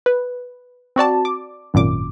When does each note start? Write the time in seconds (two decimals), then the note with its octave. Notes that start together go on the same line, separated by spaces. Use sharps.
0.06 B4
0.96 C4 F#4 D5 A5
1.25 D6
1.74 G#1 F#2 A#2 D6